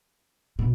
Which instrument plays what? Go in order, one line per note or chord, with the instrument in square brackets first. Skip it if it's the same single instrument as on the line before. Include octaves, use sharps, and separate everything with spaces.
[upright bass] B2